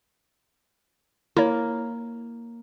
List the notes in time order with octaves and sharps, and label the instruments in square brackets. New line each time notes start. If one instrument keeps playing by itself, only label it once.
[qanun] A#3 [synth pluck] E4 C#5